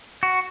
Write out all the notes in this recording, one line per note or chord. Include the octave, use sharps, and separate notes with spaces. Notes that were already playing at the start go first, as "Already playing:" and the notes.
F#4